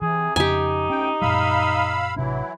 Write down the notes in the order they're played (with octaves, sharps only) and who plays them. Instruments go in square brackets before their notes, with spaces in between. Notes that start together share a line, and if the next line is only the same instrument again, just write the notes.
[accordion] C3 [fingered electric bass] E3 [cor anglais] G#4
[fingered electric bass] F2 C#3 [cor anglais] D#4 [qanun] G4 G#5
[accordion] D2 G5 [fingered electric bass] C#4
[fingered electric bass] F#2 A#2 G3 [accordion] F5 B5 E6
[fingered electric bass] A1 C3 D4 [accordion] E3 F#3 E4